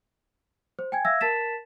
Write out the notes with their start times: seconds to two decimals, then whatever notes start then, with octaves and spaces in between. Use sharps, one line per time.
0.79 C5
0.92 G5 G#5 G#6
1.05 E5 F5 E6 G#6 A#6
1.21 A#4 A5 A6 B6 E7